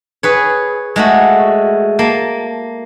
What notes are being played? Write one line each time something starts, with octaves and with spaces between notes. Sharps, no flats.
G#4 B4 C#5
G#3 A3 F#4
A#3 A5